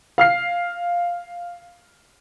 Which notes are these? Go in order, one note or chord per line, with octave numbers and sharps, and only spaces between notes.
F5 F6 C7